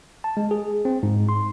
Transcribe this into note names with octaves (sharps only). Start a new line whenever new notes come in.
A5
G#3
G#4
C4
G#2
C6